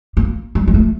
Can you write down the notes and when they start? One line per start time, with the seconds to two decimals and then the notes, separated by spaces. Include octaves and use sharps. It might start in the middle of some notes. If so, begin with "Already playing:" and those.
0.17 A#3
0.55 G3
0.68 G3
0.74 A3